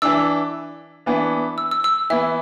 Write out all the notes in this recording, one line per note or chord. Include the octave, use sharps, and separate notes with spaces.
E3 D4 E6
E3 B3 D4
E6
E6
E6
E3 B3 E4 E5